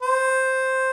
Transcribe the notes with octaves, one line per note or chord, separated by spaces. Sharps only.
C5